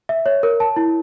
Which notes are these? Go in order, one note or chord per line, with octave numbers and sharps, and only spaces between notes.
E5
C#5
A#4
A5
E4